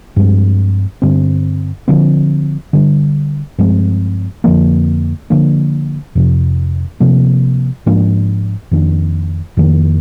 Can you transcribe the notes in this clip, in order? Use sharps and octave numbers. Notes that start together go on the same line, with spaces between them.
G2 F3 G#3 C4
G2 D3 G3 C4
D3 F3 C4
D3 G3 A#3 D4
G2 F3 G#3 C4
F2 D3 F3 A#3
D3 F3 A#3 D4
F2 C3 F3
C3 F3 A#3
G#2 F3 A#3 D4
F2 D#3 A#3 D4
F2 D#3 A#3